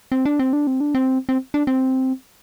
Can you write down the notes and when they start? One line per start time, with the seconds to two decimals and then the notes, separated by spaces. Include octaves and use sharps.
0.12 C4
0.25 D4
0.39 C4
0.53 D4
0.67 C4
0.81 D4
0.95 C4
1.29 C4
1.54 D4
1.67 C4